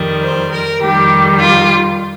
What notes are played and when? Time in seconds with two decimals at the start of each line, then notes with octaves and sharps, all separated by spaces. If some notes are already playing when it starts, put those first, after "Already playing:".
Already playing: F2 D#3 G3
0.22 C5
0.52 A#4
0.81 F2 D#3 G3 G4
1.39 F4